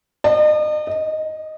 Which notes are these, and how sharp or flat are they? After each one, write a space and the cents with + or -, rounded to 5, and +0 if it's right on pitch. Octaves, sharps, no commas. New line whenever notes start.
D#5 -40
D#5 +5